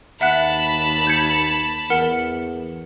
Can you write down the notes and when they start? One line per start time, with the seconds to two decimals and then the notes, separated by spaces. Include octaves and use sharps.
0.21 D#2 E5 F#5 A5 B5 F#6
1.07 G6 G#6 C#7
1.90 E2 A#4 F#5 C#7